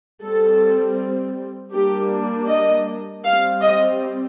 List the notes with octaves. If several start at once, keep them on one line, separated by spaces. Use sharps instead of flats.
G3 C4 A4
G3 A#3 D4 G4
D#5
G3 C4 F5
D#5